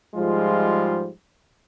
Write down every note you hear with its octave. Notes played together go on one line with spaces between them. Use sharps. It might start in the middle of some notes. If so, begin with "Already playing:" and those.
G#2 F3 G3 G#3 F4